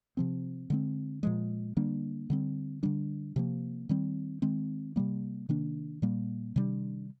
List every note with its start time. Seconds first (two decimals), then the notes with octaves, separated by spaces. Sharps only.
0.17 C3 F3 C4
0.70 D3 G#3 C4
1.23 A#2 F3 G#3
1.77 D3 G3 A#3 D4
2.30 D3 G3 C4
2.83 D3 G3 D4
3.36 C3 F3 A#3
3.89 D#3 G3 C4
4.42 D#3 G#3 C4
4.96 C3 G3 A#3
5.49 C3 D#3 A#3 D4
6.02 A#2 G3 A#3
6.56 C3 D#3 G3 D4